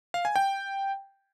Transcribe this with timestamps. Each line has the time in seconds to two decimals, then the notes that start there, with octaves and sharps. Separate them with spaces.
0.14 F5
0.25 G#5
0.36 G5